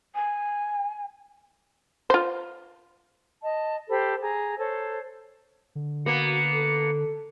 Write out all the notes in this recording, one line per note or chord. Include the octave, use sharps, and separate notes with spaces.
G#5
F4 C5
D#5 A5
G4 A4 C5 B5
G#4 A#5
A4 C5 C#5
D3
A#3 B3 F#4 C#7
A4